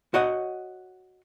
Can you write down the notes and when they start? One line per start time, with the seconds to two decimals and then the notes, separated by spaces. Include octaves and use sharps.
0.14 F#4 C#5 D#5 F#5